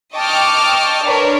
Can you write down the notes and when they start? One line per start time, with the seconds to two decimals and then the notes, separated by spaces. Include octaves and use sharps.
0.14 D#5 G5 A5 C#6 D6 F6
1.04 D4 A#4 B4 C#5